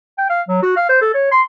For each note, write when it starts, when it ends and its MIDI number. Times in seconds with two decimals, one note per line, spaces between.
0.18 0.26 79
0.30 0.41 77
0.48 0.59 54
0.62 0.76 66
0.76 0.85 77
0.89 0.99 72
1.01 1.09 69
1.14 1.28 73
1.31 1.41 84